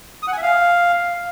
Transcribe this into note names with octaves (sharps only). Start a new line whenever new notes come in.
D#6
F#5
G#5
E5
F5